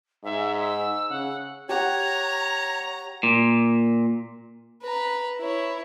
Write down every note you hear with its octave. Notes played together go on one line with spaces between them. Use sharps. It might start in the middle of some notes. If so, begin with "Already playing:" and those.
G#2 E5
E6
C#3 F#5
G4 C#5 F#5 G5 A#5
A#2
B4 A#5
E4 C#5